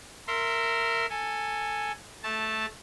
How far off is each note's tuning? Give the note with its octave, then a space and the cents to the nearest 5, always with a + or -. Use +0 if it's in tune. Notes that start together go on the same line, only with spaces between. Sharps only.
A#4 -15 E5 +5 C6 +0
A4 +10 G#5 +0
A3 -10 A5 +0